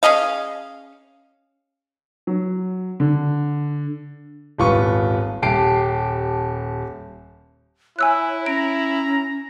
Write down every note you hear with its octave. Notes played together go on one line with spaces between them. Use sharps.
C#4 G#4 D#5 F5
F#3
D3
D#1 G#1 F4 B4 C#6
D#1 G4 A5 C7 D7
E4 C#5 G#5 E6 F#6
C#4 A#5 D7